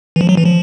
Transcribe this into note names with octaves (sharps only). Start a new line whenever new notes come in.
E3
F3
F#3
E3
F3